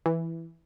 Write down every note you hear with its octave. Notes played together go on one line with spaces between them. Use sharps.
E3